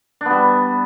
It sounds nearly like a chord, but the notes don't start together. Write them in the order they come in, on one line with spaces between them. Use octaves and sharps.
D4 B3 G3